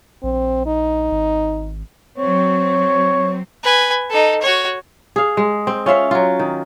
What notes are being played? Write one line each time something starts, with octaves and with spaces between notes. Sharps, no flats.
A#1 C4
D#4
G#1
F#3 C4 C#5
B4 G#5
D#4 A4
F#4 C#5
G#4 F5
G#3
C4
C#4 F4 E5 F5
F#3 F4
D#3